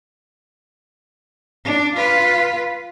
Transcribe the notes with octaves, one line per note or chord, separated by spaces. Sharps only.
D4
F4 B4